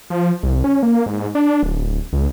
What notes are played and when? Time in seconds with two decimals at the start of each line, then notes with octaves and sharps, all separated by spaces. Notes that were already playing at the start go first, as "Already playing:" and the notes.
0.10 F3
0.43 C2
0.64 C#4
0.83 A#3
1.06 G#2
1.35 D4
1.63 D1
2.13 C#2